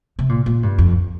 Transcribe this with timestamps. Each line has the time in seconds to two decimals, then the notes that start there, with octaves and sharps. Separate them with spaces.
0.19 C3
0.29 A#2
0.46 A#2
0.63 G2
0.78 F2